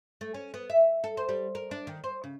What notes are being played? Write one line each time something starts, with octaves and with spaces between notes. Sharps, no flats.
A3
C#4
B3
E5
A4
C5
G3
A#4
D4
D#3
C5
C#3